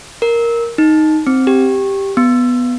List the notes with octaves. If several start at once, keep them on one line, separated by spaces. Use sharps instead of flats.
A#4
D#4
C4
G4
B3